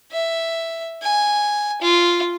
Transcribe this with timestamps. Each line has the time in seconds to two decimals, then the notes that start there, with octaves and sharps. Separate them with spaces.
0.12 E5
1.02 G#5
1.82 F4